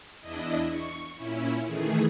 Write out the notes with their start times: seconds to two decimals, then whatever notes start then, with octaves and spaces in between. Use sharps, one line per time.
0.21 E2 D4 E4 D#5
0.69 C#6
1.16 A#2 C#4 E4
1.67 D#3 E3 A3 G#4